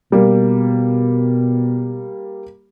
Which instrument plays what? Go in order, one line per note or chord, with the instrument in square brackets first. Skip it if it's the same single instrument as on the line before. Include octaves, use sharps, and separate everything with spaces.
[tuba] B2 [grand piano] G3 A#3